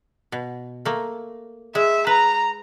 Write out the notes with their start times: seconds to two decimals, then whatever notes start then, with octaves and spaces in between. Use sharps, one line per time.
0.32 B2
0.85 A3 A#3
1.75 G#3 E5
2.07 B4 A#5